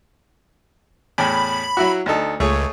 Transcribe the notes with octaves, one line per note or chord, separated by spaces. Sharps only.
E2 A2 G5 B5
F#3 E4 F#4
D2 D#4 A4
C#2 A3 G#4 C#5